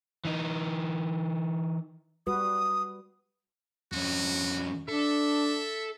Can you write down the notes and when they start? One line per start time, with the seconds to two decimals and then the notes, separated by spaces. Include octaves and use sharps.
0.25 E3 D#4
2.27 G3 F#4 B4 D#6
3.92 F2 C#4 F#4
4.89 D4 A4 E5